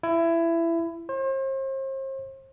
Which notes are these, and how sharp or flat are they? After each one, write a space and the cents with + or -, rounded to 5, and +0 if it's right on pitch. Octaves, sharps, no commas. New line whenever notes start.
E4 +20
C5 +40